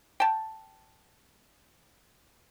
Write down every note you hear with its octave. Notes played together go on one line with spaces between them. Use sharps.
G5 A5